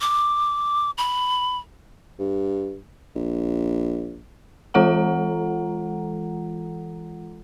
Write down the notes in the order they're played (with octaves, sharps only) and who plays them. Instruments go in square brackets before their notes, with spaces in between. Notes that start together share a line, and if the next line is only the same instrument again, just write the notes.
[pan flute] D6
B5
[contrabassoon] G2
A#1
[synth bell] E3 G#3 F4 A4 F#5 A#5